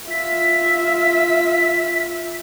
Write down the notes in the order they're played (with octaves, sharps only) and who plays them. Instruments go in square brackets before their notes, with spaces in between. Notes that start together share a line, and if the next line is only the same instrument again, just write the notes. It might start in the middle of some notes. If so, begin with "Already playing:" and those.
[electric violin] F4 E5 [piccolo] B6